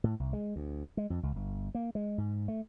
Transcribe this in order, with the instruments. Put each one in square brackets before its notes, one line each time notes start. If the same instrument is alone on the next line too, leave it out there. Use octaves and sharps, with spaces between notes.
[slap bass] A2
C2
G#3
D2
G#3
F2
C#2
G1
A#3
G#3
G#2
A3